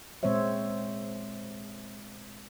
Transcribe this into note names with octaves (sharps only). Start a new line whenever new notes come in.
A#2 G#3 C4 C5 C#5 E5